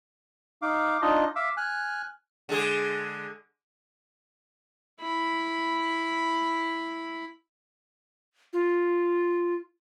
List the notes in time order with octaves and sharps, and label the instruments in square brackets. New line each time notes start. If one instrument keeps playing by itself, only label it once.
[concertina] D#4 F5 D6
D4 D#4 F4 D#5
E5 F5 D6 E6
G#5 F6 F#6
[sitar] D3 G#3 G#4
[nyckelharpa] E4 B5
[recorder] F4